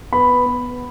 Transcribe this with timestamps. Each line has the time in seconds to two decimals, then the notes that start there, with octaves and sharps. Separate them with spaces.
0.13 B3 B5
0.46 B3